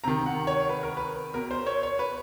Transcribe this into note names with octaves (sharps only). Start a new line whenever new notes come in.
C3 D#3 A#5
F#5
C#5
B4
A#4
B4
B2 A#4
C5
C#5
C#5
B4